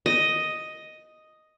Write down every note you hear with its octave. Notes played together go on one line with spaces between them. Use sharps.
D#5